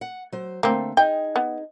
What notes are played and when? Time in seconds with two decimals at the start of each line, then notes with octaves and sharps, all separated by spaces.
0.01 F#5
0.32 F#3 C5
0.63 D3 A3 A#3 C4
0.97 D#4 G#4 G5
1.36 B3